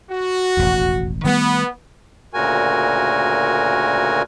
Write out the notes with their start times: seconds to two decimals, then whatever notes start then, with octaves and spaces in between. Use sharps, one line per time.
0.10 F#4
0.57 E1 A1 F2
1.24 D#3 G3 A3 B3
2.34 D2 A#2 C#3 F#4 A#4 G#5